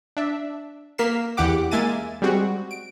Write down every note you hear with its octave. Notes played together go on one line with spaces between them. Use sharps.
D4 E5
A#3 A#4 B6 C7 E7
E2 E3 G4 F#5 D6
G#3 A#3 E5 G#5 A6 D#7
G3 G#3 C4 F#4
D7